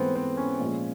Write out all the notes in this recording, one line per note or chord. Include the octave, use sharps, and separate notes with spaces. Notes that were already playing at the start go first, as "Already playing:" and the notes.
Already playing: G#2 E3 A3 B3 C4
C4
C#4
A#2 F3 G#3